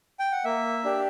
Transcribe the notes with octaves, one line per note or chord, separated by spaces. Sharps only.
G5
F#5
A#3 E5
D4 G4